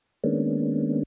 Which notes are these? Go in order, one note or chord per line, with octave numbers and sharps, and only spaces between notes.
D#3 G#3 A#3 B3 C#4 D4